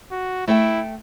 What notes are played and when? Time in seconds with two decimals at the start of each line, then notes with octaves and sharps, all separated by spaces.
0.11 F#4
0.48 A3 E4 E5 G5